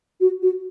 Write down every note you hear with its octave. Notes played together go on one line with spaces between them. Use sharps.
F#4
F#4